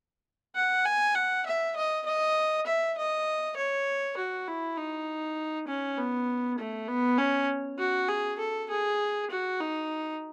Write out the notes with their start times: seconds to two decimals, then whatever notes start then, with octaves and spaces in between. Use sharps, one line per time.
0.55 F#5
0.85 G#5
1.15 F#5
1.46 E5
1.76 D#5
2.05 D#5
2.66 E5
2.97 D#5
3.57 C#5
4.17 F#4
4.47 E4
4.77 D#4
5.68 C#4
5.98 B3
6.58 A3
6.88 B3
7.18 C#4
7.78 F#4
8.08 G#4
8.39 A4
8.70 G#4
9.30 F#4
9.60 D#4